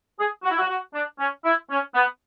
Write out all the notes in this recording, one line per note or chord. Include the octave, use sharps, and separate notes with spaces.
G#4
F#4
E4
F#4
F#4
D4
C#4
E4
C#4
B3